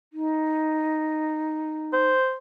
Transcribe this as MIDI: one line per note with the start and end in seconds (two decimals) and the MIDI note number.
0.13 2.08 63
1.93 2.36 72